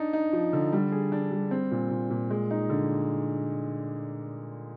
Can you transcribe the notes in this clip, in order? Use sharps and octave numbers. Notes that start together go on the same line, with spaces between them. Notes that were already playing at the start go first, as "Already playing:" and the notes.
Already playing: D4 D#4
D#4
F3
D3
G3
G#4
D4
G3
C4
A#2
A#2
A#2
G#3
D#4
D3